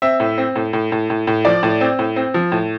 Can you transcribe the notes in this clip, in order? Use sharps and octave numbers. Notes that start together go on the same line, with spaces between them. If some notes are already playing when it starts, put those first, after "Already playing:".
C4 E5
A2
C4
A2
A2
A2
A2
A2
F3 D5
A2
C4
A2
C4
F3
A2